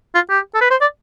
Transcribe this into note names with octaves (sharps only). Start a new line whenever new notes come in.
F4
G4
A4
B4
C5
D5